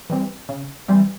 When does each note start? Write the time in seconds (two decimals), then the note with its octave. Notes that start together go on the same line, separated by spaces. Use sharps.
0.10 E3 G3 C4
0.49 C#3
0.88 E3 G3 C4